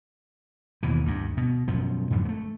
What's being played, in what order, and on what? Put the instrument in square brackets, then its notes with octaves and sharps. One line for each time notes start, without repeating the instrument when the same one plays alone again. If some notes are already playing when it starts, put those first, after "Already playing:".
[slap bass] D#2 B2 E3
D2 G2
B2
F#2 B2 F3
F2 G#2 D3
G#3 A3